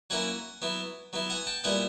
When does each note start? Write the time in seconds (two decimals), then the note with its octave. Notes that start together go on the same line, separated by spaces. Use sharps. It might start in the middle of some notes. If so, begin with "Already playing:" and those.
0.10 F#3 A#3 C#4 E4 F#5 G#5
0.62 F#3 B3 E4
1.13 F#3 B3 E4
1.30 F#5 G#5
1.47 G5 A5
1.64 A#2 G3 B3 E4 F#5 G#5